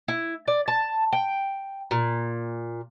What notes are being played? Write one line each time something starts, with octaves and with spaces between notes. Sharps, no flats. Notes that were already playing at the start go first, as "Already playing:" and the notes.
E4
D5
A5
G5
A#2